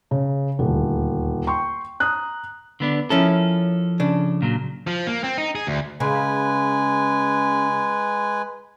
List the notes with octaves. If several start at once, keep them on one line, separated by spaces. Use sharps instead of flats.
C#3
D#1 D2
G5 C6 C#6
A#5 D#6 F#6
D3 B3 D4
F3 C#4 E4 A4 A#4
C#3 D4
A#2 F#3
F3
A#3
C4
D#4
G#4
D2
C#3 G#3 B4 G#5